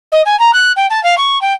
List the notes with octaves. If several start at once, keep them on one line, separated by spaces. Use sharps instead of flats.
D#5
G#5
A#5
F#6
G5
A5
F5
C#6
G5